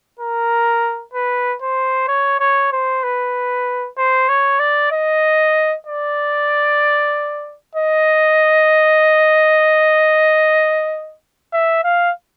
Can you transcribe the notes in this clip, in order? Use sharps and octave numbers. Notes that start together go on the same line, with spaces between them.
A#4
B4
C5
C#5
C#5
C5
B4
C5
C#5
D5
D#5
D5
D#5
E5
F5